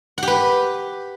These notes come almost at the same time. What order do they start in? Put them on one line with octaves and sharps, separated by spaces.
F#5 G4 B4